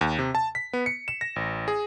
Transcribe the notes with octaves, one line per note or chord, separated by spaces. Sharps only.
D#2
C3
A5
B6
B3
C#7
E7
A#6
A1
G#4